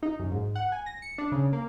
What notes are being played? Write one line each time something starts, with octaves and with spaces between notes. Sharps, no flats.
D#4
F#2
G#2
F#5
G#5
A#6
C#7
D4
C#3
A#3